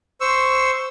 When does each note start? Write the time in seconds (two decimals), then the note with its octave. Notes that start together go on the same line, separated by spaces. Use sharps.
0.21 C5 C#6 E6